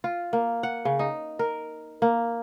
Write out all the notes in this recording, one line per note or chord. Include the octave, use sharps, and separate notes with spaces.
F4
A#3
F#5
C#3
D#4
A#4
A#3